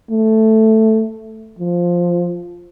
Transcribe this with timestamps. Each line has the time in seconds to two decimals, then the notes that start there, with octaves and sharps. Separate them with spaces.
0.11 A3
1.59 F3